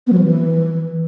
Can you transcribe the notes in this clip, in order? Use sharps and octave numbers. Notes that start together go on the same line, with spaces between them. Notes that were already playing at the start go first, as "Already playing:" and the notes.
B3
F#3
F3
E3